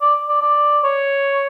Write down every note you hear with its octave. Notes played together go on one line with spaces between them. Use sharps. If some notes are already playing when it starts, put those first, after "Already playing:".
D5
D5
D5
C#5